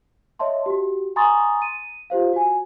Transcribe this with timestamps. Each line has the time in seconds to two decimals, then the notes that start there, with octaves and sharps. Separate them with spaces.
0.39 C#5 D#5 E5 A5 C6
0.66 F#4 G4
1.16 G#5 A#5 C6 C#6 D#6 A6
1.62 D#7
2.10 F4 G4 C5 F5
2.33 F#4 G#5